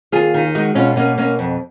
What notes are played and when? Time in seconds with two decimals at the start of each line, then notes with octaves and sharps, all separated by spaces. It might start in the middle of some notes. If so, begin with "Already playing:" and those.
0.12 D#2 F4 G#4
0.34 D#3
0.55 G#3 D#4 F#4
0.75 B2 C#4 F4
0.96 B2 A#3 C#4
1.18 B2 A#3 C#4
1.39 F2